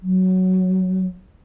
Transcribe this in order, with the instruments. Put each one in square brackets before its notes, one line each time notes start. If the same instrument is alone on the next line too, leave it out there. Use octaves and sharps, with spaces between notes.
[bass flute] F#3